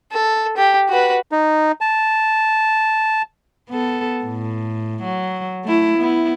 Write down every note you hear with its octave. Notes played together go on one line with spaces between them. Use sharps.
A4
G4
F#4 B4
D#4
A5
B3 A4
A2
F#3
A3 E4
B3 E4